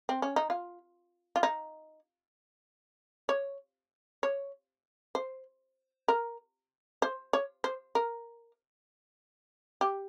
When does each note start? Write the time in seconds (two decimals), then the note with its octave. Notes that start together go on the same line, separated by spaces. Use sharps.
0.09 C4
0.22 C#4
0.36 D#4
0.50 F4
1.36 F4
1.43 D#4
3.29 C#5
4.23 C#5
5.15 C5
6.08 A#4
7.02 C5
7.33 C#5
7.64 C5
7.95 A#4
9.81 G4